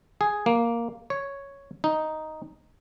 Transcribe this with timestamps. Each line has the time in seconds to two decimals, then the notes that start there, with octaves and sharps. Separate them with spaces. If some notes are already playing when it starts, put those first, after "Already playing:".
0.21 G#4
0.46 A#3
1.10 C#5
1.84 D#4